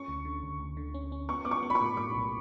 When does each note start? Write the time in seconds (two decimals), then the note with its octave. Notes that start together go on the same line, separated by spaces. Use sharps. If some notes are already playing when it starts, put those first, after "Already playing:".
Already playing: C#4 C#6
0.08 D2
0.25 D3
0.43 D2
0.60 D2
0.77 D3
0.94 C#4
1.12 C#4
1.29 B3 C#6
1.45 B3 D6
1.51 C#6
1.63 B3
1.70 B5
1.75 C#6
1.80 A2
1.97 A2 D6
2.15 B1